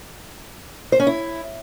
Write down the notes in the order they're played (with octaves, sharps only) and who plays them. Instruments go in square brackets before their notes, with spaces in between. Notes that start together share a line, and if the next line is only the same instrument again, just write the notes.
[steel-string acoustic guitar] C5
C#4
E4